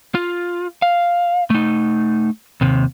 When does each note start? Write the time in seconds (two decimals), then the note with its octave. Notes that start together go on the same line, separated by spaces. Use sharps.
0.15 F4
0.82 F5
1.50 A3 D#4
2.61 D#2 C3